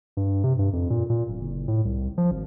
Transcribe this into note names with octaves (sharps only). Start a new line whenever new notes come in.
G2
C3
G2
F2
A#2
A#2
D1
F#1
A2
C2
F3
G#1